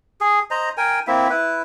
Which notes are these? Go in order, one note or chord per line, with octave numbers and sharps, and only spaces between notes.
G#4
C5 D#5 A#5
A#4 G5 G#5
A#3 C4 E4 E5
E4 B4